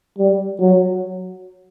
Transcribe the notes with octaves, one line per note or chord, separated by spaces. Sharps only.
G3
F#3